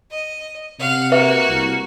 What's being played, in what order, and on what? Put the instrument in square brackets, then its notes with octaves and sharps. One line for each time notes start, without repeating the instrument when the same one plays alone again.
[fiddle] D#5
[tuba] C3 [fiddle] F5 F#5
[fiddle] A#3 F#4 [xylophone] B4 E5
[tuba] C2